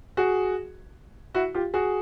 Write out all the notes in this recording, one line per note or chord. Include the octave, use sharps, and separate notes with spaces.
F#4 G#4
E4 F#4
F4 G4
F#4 G#4